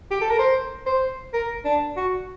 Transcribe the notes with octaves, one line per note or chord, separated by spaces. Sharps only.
G4
A4
A#4
C5
C5
A#4
D4
F#4